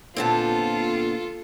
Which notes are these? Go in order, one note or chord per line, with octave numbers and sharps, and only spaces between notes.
A#2 D3 B3 C4 F4 A4 A5